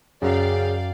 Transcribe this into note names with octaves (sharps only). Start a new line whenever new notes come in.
F#2 C#3 D5 F5 G5